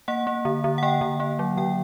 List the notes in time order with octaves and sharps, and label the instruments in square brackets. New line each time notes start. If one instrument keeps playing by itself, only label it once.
[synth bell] A#3 F#5
A#3
D3
D3
F#5
A#3 G5
D3
A#3
F#3
D3 G5